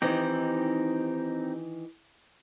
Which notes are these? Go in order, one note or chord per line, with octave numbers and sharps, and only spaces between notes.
D#3 E3 C4 D#4 G4